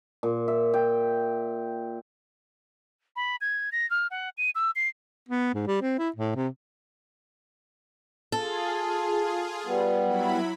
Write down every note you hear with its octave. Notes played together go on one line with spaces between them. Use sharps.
A#2
E5
G5
B5
G#6
A#6
F6
F#5
D#7
E6
C7
B3
G#2
G3
C4
E4
A2
C3
F4 G#4 A4
G3 B3
F#3 E4 B5